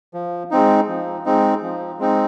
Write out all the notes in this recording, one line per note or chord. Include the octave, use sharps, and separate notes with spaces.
F3
G#3 C4 D#4
F3
G#3 C4 D#4
F3
G#3 C4 D#4